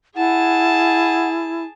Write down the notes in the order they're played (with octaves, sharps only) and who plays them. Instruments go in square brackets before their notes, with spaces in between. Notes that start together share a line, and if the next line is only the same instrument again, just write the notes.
[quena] E4 [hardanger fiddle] G#4 A5 [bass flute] F#5